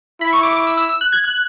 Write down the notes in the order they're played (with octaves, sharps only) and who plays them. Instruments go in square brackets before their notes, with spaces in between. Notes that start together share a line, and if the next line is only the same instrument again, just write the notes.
[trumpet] E4 [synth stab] B5
[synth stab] C#6
D6
D6
E6
E6
E6
F#6
G#6
F#6